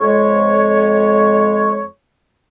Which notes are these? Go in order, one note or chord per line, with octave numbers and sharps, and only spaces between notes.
F2 G#3 C#5